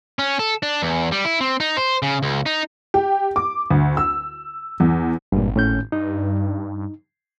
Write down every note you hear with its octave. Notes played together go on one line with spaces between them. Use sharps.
C#4
A4
D4
E2
G3
E4
C4
D#4
C5
C#3
C#2
D#4
G4
D6
D2
E6
E2
G#1 G2 A#2
A2 C#4 G6
G2 D#4